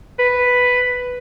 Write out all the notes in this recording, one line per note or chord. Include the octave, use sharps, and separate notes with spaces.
B4